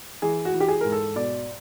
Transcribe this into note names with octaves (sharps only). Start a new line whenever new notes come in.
E3 G#4
F#4
E3
G4
G#4
G#2 A#4
A4
B2 D5